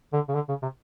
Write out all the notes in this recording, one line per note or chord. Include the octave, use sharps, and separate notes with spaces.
D3
C#3
D3
C#3
C3